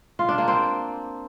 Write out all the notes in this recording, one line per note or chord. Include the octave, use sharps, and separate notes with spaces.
F4
D4
A#3
C4